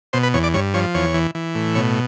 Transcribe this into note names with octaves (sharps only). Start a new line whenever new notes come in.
B2 C5
B4
E2 C#5
D5
G2 C#5
F3 C#5
E2 C#5
E3
E3
A2
B2 C#5